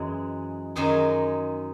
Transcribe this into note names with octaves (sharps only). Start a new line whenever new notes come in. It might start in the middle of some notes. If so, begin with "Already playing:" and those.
Already playing: F#2 E3 G#3
F#2 D#3 G#3 G#4